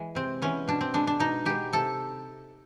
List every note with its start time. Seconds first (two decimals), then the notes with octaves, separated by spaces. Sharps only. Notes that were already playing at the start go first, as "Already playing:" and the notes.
Already playing: E3 G#3
0.15 C3 C4
0.42 E3 G#3 B3 C#4
0.68 B2 D4
0.81 C4
0.94 G#3 B3 D4
1.07 D4
1.20 B2 D#4
1.45 G#3 B3 G4
1.73 C3 A4